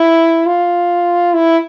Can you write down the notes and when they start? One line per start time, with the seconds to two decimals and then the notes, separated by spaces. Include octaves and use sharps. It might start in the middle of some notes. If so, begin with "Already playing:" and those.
Already playing: E4
0.46 F4
1.34 E4